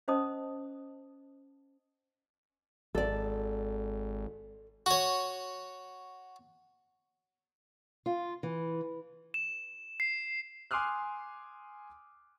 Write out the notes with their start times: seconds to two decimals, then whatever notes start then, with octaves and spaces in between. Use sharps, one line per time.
0.08 C#4 C5 D#5 A5 D#6
2.95 G#1 A4 D5
4.86 F#4 C#5
8.06 F4
8.43 E3
9.34 E7
10.00 C7
10.71 G#5 C6 D6 D#6 F6 F#6